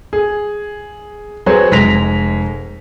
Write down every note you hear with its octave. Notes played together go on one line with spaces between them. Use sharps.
G#4
F#3 C4 G#4 B4 C#5
F1 G#3 A#6 B6 F7